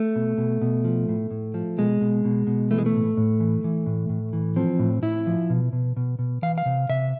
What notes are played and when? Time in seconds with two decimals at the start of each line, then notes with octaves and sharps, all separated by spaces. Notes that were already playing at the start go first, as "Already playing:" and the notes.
Already playing: A3
0.16 B2
0.38 B2
0.62 B2
0.85 F3
1.09 A2
1.31 A2
1.54 F3
1.78 B2 G#3
2.01 B2
2.25 B2
2.47 B2
2.71 E3 A3
2.78 G#3
2.86 A3
2.94 A2
3.17 A2
3.40 E3
3.64 E3
3.86 A2
4.10 A2
4.33 E3
4.56 F3 C4
4.79 A2
5.02 A2 E4
5.27 F3
5.50 B2
5.73 B2
5.97 B2
6.19 B2
6.42 E3 F5
6.58 F5
6.66 C3
6.89 C3 E5